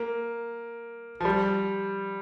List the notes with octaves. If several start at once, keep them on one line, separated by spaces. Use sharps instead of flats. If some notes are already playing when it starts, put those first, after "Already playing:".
Already playing: A#3
F3
G3